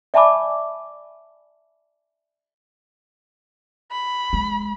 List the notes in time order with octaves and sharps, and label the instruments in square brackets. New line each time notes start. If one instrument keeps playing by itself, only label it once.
[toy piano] D5 E5 G#5 A5 B5 D6
[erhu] B5
[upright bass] G#3